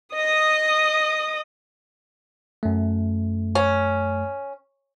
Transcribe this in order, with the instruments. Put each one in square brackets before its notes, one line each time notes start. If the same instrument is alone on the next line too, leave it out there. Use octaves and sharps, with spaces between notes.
[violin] D#5 D#6
[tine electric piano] F#2 A3
[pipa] C#4